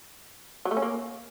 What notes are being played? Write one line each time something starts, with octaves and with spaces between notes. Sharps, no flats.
F#3
A3
C#4
A#3